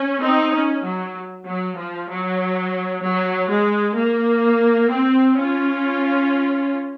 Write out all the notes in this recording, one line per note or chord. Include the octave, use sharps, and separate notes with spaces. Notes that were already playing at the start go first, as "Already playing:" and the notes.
Already playing: C#4
C4 D#4
C#4
F#3
F#3
F3
F#3
F#3
G#3
A#3
C4
C#4 F4